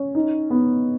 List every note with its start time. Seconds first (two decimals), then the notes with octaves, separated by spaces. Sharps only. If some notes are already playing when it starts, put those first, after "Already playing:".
Already playing: C#4
0.15 D#4
0.50 B3